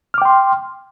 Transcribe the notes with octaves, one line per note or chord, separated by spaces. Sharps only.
G5 C6 D6 F6